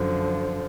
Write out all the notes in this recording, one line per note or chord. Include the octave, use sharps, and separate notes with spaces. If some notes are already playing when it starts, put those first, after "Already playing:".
Already playing: F#2 D3 F3